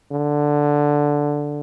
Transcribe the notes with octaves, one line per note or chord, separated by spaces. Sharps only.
D3